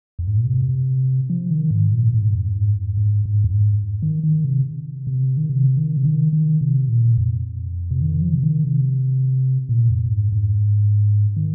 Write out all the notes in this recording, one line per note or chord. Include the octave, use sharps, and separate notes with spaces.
F2
G#2
A#2
C3
F3
D#3
G#2
A#2
G#2
F2
G#2
G#2
G#2
F2
G#2
D#3
D#3
C3
C3
D#3
C3
D#3
C3
D#3
D#3
C3
A#2
F2
C3
D#3
F3
C3
D#3
C3
A#2
F2
G#2
G#2
D#3